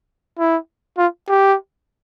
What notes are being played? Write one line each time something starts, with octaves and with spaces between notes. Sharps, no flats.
E4
F4
G4